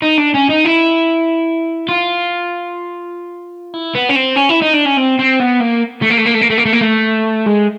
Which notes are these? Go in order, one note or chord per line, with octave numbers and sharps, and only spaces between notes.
D#4
D4
C#4
D#4
E4
F4
E4
B3
C#4
C4
C#4
E4
D#4
D4
C#4
C4
C4
B3
A#3
A3
A#3
A3
A#3
A3
A#3
A3
A#3
A3
A#3
A3
G#3